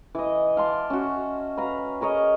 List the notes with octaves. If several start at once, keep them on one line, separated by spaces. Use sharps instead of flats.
E3 D#5
F5 A5 C6 D6
C#4 F#4
B4 F5 A#5
G#4 A#4 C#5 D#5